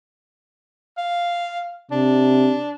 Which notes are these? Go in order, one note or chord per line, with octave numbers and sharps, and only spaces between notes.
F5
C3 D4